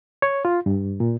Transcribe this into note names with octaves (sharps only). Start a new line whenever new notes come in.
C#5
F4
G2
A#2